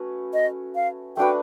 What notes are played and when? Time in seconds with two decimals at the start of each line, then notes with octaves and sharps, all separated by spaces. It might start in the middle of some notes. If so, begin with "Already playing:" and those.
Already playing: A3 C#4 F#4 B4
0.33 D#5
0.75 F5
1.17 A3 D4 F#4 B4 G5